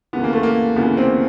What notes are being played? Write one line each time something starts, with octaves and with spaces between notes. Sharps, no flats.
D2 C#3 E3 B3
A#3
A3
A#3
D2 C#3 E3 B3
C4